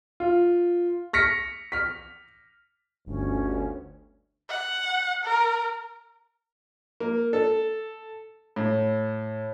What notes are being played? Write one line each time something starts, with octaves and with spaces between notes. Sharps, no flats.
F4
F6 A#6 B6 C#7
F6 B6
G1 D2 C#4
F#5
A#4
A#3
A4
A2